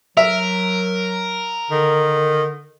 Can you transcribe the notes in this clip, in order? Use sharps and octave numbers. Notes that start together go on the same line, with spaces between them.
F#3 A#4 E5
D3 D#3